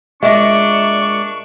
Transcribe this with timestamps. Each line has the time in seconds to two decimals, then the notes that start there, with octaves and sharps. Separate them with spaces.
0.23 A#2 G#3 D4 D#5 E5 C#6